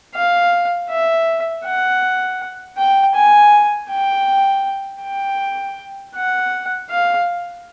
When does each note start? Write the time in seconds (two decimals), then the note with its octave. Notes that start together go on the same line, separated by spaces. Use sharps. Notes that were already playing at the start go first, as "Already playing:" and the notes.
0.15 F5
0.89 E5
1.64 F#5
2.78 G5
3.15 G#5
3.90 G5
5.02 G5
6.15 F#5
6.90 F5